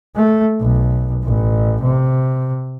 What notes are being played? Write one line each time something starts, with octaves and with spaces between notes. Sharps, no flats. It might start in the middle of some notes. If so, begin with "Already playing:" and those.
A3
B1
A1
C3